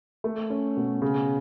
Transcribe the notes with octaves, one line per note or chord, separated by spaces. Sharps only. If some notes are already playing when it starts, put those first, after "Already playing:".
A3
C#4
B2
C#3